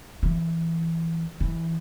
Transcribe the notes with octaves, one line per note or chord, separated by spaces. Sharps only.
E3
E3